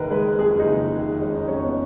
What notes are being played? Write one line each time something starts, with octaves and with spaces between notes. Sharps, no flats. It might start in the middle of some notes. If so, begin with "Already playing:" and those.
Already playing: F#1 D#3 G#4 A#4 B4
G#3 B4
F2 G#4
D#4
F#1
D#3
G#4
G#3 C#4
D#4
F2 C#4
B3